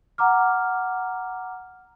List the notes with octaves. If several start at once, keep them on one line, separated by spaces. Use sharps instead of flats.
F#5 A#5 D6 F6